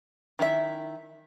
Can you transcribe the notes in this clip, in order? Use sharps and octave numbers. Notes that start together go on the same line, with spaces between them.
D#3 E4 F4 E5